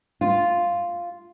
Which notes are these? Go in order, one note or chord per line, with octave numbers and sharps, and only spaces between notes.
F4